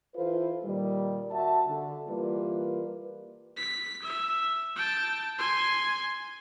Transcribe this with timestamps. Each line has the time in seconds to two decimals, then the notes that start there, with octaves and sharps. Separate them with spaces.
0.16 E3 F4 A4 B4 C5
0.64 A#2 D#3 G3
1.31 F#4 E5 A5
1.68 D3
2.07 E3 G3 A#3 F4 B4
3.57 B6
4.02 E5
4.76 G5 A5
5.38 G#5 C6